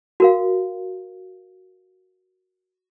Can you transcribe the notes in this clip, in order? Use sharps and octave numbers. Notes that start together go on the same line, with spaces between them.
F#4 A#4 F5